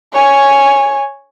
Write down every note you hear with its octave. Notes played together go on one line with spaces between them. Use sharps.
C#5 G#5